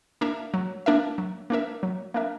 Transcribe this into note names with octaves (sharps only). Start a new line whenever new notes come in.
A#3 D4 A#4 E5
F#3
A#3 D4 A#4 E5
F#3
A#3 D4 A#4 E5
F#3
A#3 D4 A#4 E5